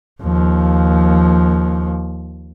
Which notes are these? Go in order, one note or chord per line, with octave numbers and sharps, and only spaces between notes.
D#2 F3